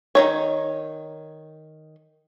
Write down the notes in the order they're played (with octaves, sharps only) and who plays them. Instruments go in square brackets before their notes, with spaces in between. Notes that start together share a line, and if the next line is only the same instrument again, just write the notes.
[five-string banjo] D#3 F#3 C#5